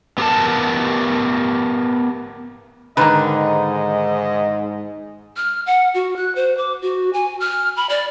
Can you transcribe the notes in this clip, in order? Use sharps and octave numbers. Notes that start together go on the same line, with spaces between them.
B3 G4 A#4 A5
G#2 D3 D#3 A#3 B4 D#5
F6
F#5
F#4
F#6
C5
D6
F#4
G#5
F6
B5
D5